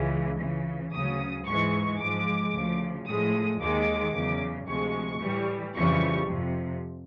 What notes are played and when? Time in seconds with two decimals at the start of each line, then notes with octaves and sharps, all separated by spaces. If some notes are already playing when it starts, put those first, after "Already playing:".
Already playing: C#2 C#3 E3 G#3
0.39 C#2 C#3 E3
0.93 D2 C#3 F#3 D#6
1.46 G#2 E3 G#3 C#6
2.00 G#2 F3 G#3 D6
2.54 D2 C#3 F3
3.07 A2 F3 G#3 D#6
3.60 D#2 D#3 G#3 D6
4.14 E2 C#3 F#3
4.67 D2 C3 F3 G#3 C#6
5.21 A2 E3 G3
5.75 F2 C#3 E3 G3 C#6
6.28 F2 C3 F3